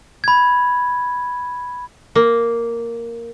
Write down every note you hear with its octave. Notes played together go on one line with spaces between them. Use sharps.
B5 G#6
A#3